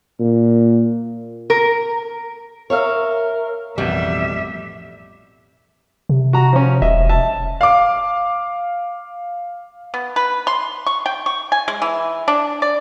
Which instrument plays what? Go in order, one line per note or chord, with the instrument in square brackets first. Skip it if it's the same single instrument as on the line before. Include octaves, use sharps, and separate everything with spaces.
[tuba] A#2
[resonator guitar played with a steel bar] A#4
[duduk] A#4 [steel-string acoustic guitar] C#5 E5 F5
[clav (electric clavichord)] A1 B2 [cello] F2 E5 [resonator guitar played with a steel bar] G3
[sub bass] C3
[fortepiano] F#4 A#5
F3 C#4
[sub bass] E1 [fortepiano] D#5 E5
[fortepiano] E5 A5
[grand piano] F5 D6
[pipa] B3
B4
C6
C#6
G5
C#6
G#5
G#3
E3
D4
D5